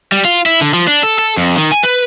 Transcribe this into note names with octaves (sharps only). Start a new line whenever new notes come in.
G3
F4
E4
D3
F3
D4
A4
A4
F2
D#3
G#5
B4